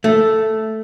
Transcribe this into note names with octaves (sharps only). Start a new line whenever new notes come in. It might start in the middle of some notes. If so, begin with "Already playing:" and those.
A3